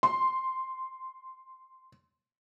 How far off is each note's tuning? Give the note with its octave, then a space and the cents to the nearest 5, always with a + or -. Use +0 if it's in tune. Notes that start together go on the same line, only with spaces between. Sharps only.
C6 -5